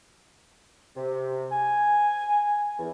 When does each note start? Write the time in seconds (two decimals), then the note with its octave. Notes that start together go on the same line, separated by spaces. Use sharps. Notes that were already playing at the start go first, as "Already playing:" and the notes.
0.96 C3
1.52 G#5
2.79 E2